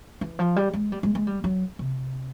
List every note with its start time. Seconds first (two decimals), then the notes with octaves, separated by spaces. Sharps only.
0.21 E3
0.39 F3
0.56 G3
0.74 G#3
0.92 G3
1.03 G#3
1.15 G#3
1.27 G3
1.44 F#3
1.79 C3